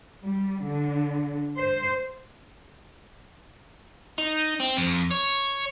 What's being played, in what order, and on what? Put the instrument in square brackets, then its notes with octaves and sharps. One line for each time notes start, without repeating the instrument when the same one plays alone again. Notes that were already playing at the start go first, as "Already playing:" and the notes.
[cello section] G3
D3
C5
[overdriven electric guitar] D#4
C4
F2
C#5